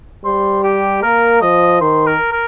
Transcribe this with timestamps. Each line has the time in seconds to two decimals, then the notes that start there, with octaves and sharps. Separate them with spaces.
0.25 G3 C5
0.63 G4
1.03 A#3 A#4
1.42 F3 D#5
1.81 D#3 C5
2.06 A#4
2.32 A#4